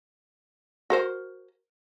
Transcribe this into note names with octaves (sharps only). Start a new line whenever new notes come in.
F#4 A#4 C5